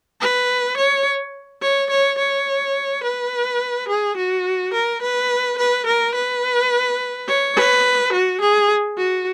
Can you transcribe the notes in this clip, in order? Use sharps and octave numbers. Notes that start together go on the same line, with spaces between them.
B4
C#5
C#5
C#5
C#5
B4
G#4
F#4
A#4
B4
B4
A#4
B4
C#5
B4
F#4
G#4
F#4